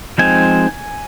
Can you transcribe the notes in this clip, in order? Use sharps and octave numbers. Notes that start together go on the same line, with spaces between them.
F3 G#3 C4 D#4 G#5